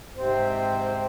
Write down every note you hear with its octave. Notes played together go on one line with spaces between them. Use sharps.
G#2 C3 C4 C5